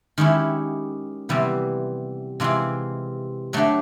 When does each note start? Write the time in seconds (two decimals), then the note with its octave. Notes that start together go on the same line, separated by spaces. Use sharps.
0.18 D#3 G#3 C#4 E4 G4
1.29 C3 E3 G3 B3
2.40 C3 E3 G#3 C4 F4
3.53 F#3 A3 D4 G4